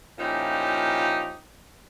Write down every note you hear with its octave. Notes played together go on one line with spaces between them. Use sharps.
A#2 F3 C#4 D#4 E4 G4